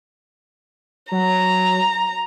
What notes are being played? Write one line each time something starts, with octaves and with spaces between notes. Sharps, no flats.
F#3 A#5